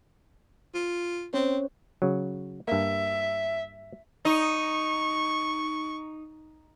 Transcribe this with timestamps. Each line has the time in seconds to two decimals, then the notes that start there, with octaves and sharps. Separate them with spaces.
0.75 F4
1.34 C4 C#4 C5 C#5
2.02 C#3 F#3
2.68 G2 A#3 E5
4.25 D#4 C#6